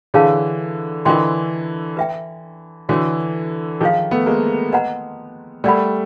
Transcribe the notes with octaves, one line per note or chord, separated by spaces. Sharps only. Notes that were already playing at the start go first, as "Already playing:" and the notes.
D3 E3 G#4 C#5 F5 A5
D3 E3 F4 A#4 D#5 G5 C6
B4 E5 G5
D3 E3 F#4 A4 C#5
D#3 F3 G#4 C5 F5
A3 B3
G#3 A#3
B4 D#5 F#5 A#5
G3 A3 A#4 D5 F#5 B5